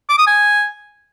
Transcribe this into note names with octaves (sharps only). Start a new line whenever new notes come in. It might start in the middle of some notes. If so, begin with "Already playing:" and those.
D6
D#6
G#5